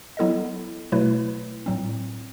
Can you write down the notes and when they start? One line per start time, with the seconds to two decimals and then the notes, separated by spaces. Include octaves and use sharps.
0.17 F#3 B3 E4 A4 D#5
0.92 B2 F#3 A3 E4 B4
1.66 A2 F#3 C4